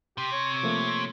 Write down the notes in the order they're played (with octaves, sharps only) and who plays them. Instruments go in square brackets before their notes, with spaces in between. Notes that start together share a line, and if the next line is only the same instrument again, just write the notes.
[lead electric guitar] C3 [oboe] G4
[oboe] C#5
[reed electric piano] F3 A3 A#3